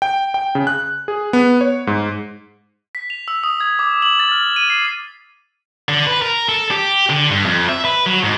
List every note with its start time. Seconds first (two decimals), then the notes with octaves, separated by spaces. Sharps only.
0.02 G5
0.34 G5
0.55 C#3
0.67 F#6
1.08 G#4
1.33 B3
1.61 C#5
1.87 G#2
2.95 B6
3.10 F7
3.28 E6
3.44 D#6
3.61 G#6
3.79 D6
4.02 F#7
4.19 A6
4.32 F6
4.56 D#7
4.70 C7
5.89 D3
6.07 B4
6.22 A#4
6.49 A4
6.71 G4
7.10 D3
7.30 G2
7.46 F2
7.69 E5
7.85 B4
8.06 F#3
8.24 G#2